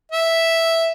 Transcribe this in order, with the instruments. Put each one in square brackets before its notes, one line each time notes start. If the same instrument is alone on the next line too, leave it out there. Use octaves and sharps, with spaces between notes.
[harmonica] E5